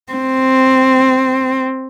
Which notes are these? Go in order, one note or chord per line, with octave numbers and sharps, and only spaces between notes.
C4